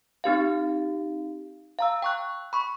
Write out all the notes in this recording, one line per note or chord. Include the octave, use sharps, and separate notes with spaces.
C4 D#4 G4 F5
F5 A#5 E6
G5 C#6 F#6
B5 C#6